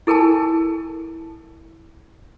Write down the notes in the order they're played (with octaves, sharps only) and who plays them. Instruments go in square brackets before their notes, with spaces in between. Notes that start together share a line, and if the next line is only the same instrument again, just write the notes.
[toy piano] E4 A4 A#4 G#5 A5